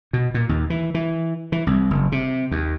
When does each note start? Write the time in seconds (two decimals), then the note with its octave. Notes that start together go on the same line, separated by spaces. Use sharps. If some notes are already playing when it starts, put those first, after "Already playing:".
0.13 B2
0.34 A#2
0.49 D#2
0.70 E3
0.94 E3
1.52 E3
1.67 C2
1.91 F#1
2.12 C3
2.51 D#2